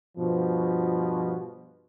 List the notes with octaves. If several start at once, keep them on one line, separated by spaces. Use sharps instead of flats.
G2 B2 F3